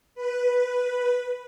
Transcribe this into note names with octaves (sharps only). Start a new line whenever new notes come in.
B4